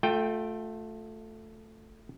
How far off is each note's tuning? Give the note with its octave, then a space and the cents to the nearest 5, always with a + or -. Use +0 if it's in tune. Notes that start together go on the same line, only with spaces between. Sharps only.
A3 +0 F4 +35 G5 +0